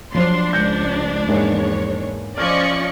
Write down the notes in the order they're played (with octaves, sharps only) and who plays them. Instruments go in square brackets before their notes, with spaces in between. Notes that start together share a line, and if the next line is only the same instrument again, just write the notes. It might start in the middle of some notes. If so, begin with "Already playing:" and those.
[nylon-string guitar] F3 C5 [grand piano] F#3 [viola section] D4 [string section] C6
[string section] C#2 [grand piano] G6 A#6 C#7
[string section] E2 C#5 [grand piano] G#2 G#3 A#3
[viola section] F3 C#4 D#5 [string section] D5 C#6 [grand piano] F6